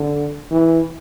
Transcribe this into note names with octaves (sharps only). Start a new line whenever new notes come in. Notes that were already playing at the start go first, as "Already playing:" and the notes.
Already playing: D3
E3